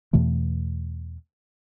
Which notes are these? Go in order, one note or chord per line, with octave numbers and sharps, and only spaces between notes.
E2 B2 E3 A3